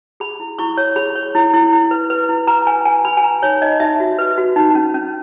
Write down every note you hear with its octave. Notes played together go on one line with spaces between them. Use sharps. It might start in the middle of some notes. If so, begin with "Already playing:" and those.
G#4 B5
E4
E4 C#6
C#5
G#4 B5
C#5
E4
E4
E4
B4
B4
E4
B4 A#5
B4 G#5
B4 G#5
B4 B5
G#5
B4 A#5
D#4 C#5
D#4 D#5
D#4 E5
F#4
B4
F#4
D#4
C#4
C#4